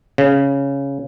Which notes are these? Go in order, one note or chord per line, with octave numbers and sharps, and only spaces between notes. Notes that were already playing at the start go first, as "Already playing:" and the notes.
C#3